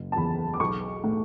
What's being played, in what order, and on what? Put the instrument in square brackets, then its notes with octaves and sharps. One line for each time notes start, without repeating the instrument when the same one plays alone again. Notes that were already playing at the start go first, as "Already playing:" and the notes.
Already playing: [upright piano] F#1
A5
E2 B5
D6
B1 C#6
A2